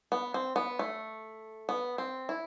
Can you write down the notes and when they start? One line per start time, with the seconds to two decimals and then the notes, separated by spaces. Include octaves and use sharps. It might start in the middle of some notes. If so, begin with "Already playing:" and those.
0.12 B3
0.34 C4
0.56 B3
0.79 A3
1.69 B3
1.98 C4
2.29 E4